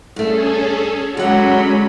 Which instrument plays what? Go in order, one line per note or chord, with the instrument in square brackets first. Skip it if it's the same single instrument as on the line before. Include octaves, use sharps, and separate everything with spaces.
[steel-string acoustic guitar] G2 A3 [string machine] C#4 G#4 A4
[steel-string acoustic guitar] D3 F#5 [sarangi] F#3 [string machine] G#3 C#4 B5